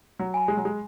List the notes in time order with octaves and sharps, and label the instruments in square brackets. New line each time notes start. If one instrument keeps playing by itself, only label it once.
[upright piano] F#3
[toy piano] G#5 B5
[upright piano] G#3
F#3
G#3